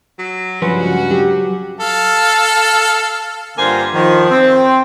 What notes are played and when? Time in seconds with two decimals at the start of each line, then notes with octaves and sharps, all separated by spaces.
0.19 F#3
0.62 C#2 G2 F3 F#3 C#4 F#4 B4
1.11 F#3 G4
1.80 A4 F5
3.58 G2 D3 A#3 F4 C5 G#5
3.94 D#3 F3
4.30 C4